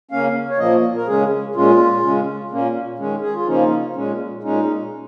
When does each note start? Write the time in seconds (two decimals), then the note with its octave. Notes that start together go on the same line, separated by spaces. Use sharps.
0.11 C#3 A#3 C#4 F5
0.50 C#5
0.59 A#2 F3 A#3 D#5
0.96 A#4
1.07 C#3 G#3 C#4 G#4
1.55 A#2 G#3 C#4 F4
2.03 C#3 G#3 C#4
2.51 A#2 A#3 C#4
2.99 D#3 G#3 C#4
3.22 G#4
3.35 F4
3.46 C#3 F3 A#3 C#4 D#4
3.95 A#2 G#3 C#4
4.43 A#2 G#3 C#4 D#4